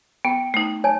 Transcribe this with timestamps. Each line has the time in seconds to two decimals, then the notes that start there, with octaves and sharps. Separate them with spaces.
0.25 B3 G5
0.54 A3 D#4
0.84 C#5 G#5 A5